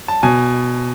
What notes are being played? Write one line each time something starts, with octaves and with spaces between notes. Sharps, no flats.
A5
B2 G#5